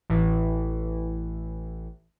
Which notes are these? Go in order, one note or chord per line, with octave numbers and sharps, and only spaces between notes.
A1 A2 E3